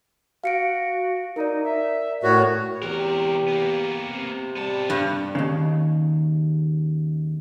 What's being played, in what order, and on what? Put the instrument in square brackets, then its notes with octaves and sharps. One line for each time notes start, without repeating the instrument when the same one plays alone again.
[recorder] F#4 [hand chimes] F5 C#7 D7
[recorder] D#4 [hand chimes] A#4 D5
[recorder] E5
[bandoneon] A2 F#4 [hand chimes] A#4 [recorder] C#5
[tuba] E2 [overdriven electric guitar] C3 A#4 [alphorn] G4
[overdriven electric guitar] A#3 B3
[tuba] C3
[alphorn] G3 [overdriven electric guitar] B3 A5
[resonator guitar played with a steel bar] G2
[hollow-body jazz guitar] D#2 A2 C#3